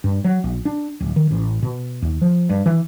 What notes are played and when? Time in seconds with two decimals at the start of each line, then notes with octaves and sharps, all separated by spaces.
0.04 G2
0.25 F#3
0.44 A#1
0.65 D4
1.00 D1
1.16 D#3
1.31 A1
1.63 B2
2.02 D#2
2.22 F3
2.50 G2
2.66 E3